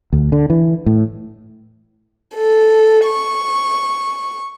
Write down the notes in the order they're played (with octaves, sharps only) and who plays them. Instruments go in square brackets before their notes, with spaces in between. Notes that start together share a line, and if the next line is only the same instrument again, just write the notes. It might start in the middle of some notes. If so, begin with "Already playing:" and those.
[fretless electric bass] D2
D3
E3
A2
[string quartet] A4
C#6